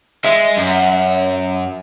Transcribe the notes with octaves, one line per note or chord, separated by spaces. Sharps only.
G#3 E5
F#2